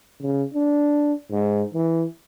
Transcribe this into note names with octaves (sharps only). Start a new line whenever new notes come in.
C#3
D4
G#2
E3